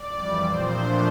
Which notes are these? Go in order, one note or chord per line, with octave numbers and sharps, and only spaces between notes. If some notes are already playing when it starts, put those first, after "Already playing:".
Already playing: D5
F2 E3 G3
A#2 F3 C4 C5
A#2 F3 A3 D4